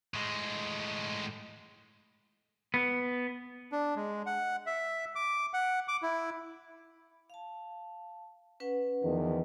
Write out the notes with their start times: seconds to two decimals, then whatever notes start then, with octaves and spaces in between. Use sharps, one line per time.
0.14 A2 G#3
2.74 B3
3.72 D4
3.96 G#3
4.26 F#5
4.66 E5
5.15 D6
5.54 F#5
5.88 D6
6.02 E4
7.30 F5 A5
8.60 C#4 B4 F#5
9.04 E2 D#3 F3